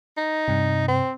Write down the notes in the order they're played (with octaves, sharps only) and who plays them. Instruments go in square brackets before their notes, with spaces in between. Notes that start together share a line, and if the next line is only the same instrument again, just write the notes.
[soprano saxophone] D#4
[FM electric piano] G2 C3
[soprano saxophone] C4